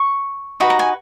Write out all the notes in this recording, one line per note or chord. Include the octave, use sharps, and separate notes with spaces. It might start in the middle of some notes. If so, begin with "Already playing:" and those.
Already playing: C#6
D#4 F#4 B4 B5
A#5
G#5